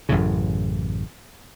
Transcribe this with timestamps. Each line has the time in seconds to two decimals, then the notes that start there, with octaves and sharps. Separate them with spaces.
0.09 A1 F#2 A2 C#3